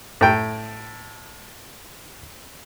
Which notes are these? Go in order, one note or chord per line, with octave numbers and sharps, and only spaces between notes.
A2 G5